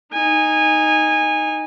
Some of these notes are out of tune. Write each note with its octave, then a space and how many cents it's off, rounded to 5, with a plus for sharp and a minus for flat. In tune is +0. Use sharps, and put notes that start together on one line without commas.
D#4 +0 G#5 -20